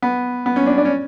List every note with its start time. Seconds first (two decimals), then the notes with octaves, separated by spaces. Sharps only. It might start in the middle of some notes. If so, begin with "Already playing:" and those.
0.02 B3
0.46 B3
0.56 C#4
0.66 D4
0.78 D4
0.85 C#4